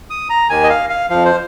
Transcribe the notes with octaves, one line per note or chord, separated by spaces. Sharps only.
D#6
A#5
D#2 D#3 G#5
D#5
F5
F5
F2 F3 F5
C5